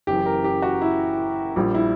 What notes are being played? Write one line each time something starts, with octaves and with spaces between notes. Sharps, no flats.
F#1 F#2 E3 G4
A#4
G4
F#4
E4
A#1 A#2 G3
E4